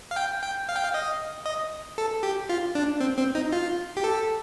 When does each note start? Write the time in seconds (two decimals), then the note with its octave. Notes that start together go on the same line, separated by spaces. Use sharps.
0.11 F5
0.16 G5
0.43 G5
0.69 F5
0.76 G5
0.84 F5
0.94 D#5
1.46 D#5
1.98 A4
2.23 G4
2.49 F4
2.75 D4
3.00 C4
3.18 C4
3.35 D#4
3.52 F4
3.97 G4
4.04 A4